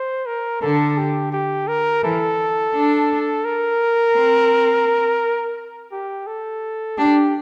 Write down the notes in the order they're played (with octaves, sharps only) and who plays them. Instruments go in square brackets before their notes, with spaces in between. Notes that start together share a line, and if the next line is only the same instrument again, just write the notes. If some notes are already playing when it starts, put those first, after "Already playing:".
Already playing: [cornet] C5
A#4
[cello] D3 [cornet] A4
[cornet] G4
G4
A#4
[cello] E3 [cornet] A4
[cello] D4
[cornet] A#4
[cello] C4
[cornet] G4
A4
[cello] D4 [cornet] G4